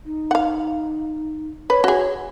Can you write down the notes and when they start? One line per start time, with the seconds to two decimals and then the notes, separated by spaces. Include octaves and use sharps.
0.05 D#4
0.31 F5 F#5
1.70 B4 C#5
1.84 F#4 G#4